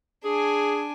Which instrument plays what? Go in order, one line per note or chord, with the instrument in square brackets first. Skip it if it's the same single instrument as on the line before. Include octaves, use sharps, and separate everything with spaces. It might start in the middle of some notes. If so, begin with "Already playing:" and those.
[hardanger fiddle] D4 G#5 [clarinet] G#4